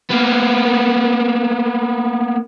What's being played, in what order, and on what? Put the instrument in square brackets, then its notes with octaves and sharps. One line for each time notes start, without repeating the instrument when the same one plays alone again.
[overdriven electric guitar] A#3 B3